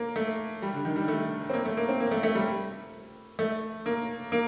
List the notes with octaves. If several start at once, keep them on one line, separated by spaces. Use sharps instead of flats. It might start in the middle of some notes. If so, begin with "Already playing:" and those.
Already playing: A#3
A3
G3
D3
D#3
G3
A3
C4
A#3
A3
A#3
C4
A#3
A3
A3
G3
A3
A#3
A#3